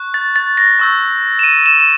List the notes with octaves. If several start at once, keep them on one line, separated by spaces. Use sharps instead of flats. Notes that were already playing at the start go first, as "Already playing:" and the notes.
Already playing: C#6 F#6
A6
A6
A#6
C#6 E6 G6
E7
D#7
E7
E7